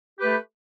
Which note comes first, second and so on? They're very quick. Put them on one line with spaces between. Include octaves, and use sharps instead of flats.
G4 B4 A3